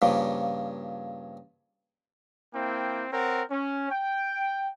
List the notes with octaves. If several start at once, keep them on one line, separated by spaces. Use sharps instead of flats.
G2 A#2 C#3 F3
A#3 C4 E4 G5
C4 A#4 C#5 F#5
C#4
G5